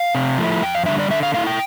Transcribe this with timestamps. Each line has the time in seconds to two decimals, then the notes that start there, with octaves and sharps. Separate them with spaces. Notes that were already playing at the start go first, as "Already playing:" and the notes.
Already playing: F5
0.15 C3
0.38 F3 A3 E4
0.62 F2 G5
0.75 F5
0.86 D3 G3 A#3 D4 E5
0.99 D5
1.10 D3 E5
1.23 F5
1.34 A3 E4 F5
1.47 G5